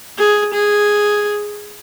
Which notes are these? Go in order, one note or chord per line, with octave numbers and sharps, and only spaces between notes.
G#4
G#4